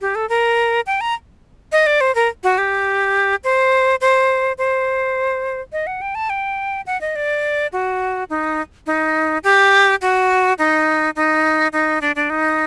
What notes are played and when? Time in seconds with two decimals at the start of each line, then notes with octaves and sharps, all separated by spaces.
0.01 G4
0.15 A4
0.29 A#4
0.86 G5
1.01 A#5
1.72 D#5
1.86 D5
2.01 C5
2.15 A#4
2.44 F#4
2.58 G4
3.44 C5
4.01 C5
4.58 C5
5.72 D#5
5.87 F#5
6.01 G5
6.15 A5
6.30 G5
6.86 F#5
7.01 D#5
7.16 D5
7.73 F#4
8.30 D#4
8.87 D#4
9.44 G4
10.02 F#4
10.58 D#4
11.16 D#4
11.73 D#4
12.01 D4
12.16 D4
12.30 D#4